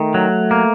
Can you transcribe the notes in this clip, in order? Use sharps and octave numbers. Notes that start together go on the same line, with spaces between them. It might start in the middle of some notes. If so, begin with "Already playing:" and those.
Already playing: D#3 A3
F#3
A#3